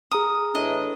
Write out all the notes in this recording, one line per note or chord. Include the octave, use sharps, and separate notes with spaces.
G#4 A#5 D#6 F6
A2 E3 D4 D#5